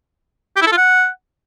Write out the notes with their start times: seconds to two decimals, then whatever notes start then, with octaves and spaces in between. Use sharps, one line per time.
0.56 G4
0.62 E4
0.67 A4
0.72 F4
0.77 F#5